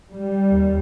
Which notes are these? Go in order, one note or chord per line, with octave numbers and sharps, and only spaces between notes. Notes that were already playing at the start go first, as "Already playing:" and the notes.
G3
D#2